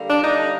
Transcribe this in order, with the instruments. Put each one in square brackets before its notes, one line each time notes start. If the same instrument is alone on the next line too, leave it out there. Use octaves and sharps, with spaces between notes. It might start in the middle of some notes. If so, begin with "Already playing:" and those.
Already playing: [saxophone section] D3 G3 A#3
D4
D#4